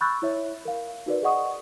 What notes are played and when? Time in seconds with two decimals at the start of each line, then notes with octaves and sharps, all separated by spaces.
0.01 B5 C#6 E6 F#6 G6 A6
0.22 E4 C#5 E5
0.65 A#4 F5
1.06 D#4 F#4 A#4 B4 D5
1.22 G#4 D5 D#5 F#5 C#6 D#6